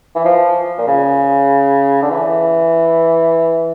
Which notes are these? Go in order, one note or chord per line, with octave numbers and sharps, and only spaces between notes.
E3
F3
A#2
C#3
D3
E3